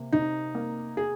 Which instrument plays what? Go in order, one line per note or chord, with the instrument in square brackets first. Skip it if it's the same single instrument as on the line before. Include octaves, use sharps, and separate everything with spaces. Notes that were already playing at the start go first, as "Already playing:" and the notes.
Already playing: [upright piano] C3 A#3
[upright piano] C3 [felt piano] D#4
[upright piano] A#3
[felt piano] G#4